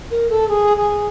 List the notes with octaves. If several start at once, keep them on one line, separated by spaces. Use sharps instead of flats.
A#4
A4
G#4
G#4